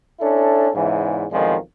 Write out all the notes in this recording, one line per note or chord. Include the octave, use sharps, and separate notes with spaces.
C#4 D4 E4 A4
E2 G#2 C#3 E3
B1 F2 D3 D#3 F3 G#3